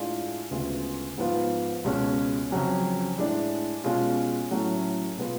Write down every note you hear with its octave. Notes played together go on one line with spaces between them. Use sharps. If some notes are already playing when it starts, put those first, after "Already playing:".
Already playing: A2 G#3 D4 F4
D2 C#3 G#3 B3 F4
G#2 F3 B3 F4
C#2 B2 G#3 C#4
F2 C#3 F#3 C#4
A2 G#3 D4
B2 G#3 C#4 F4
A2 F#3 A3 C#4
B2 G#3 B3 F4